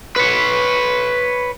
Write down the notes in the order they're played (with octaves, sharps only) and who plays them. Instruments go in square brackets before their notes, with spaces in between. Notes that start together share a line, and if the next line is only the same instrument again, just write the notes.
[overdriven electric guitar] B4 C#5